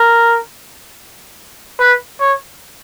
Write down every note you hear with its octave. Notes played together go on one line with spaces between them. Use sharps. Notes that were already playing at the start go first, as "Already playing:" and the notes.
Already playing: A#4
B4
C#5